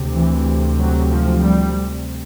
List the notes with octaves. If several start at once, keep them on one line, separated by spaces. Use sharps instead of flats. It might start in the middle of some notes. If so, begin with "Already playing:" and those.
Already playing: D2 C3
E3
F#3
F3
G3